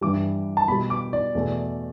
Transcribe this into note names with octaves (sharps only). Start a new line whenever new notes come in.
G2 E3 G3 D6
A5
B2 G3 B5
D6
D5
E2 B2 A3